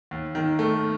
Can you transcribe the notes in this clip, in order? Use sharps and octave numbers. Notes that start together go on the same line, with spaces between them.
D#2
D#3
A3